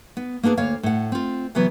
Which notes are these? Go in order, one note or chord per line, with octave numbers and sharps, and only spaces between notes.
B3
A#3 B3 D4 F#4 G#4
D2 A#3 C#5 F5
A2 F#5
C4 F4
C3 E3 F#3 B3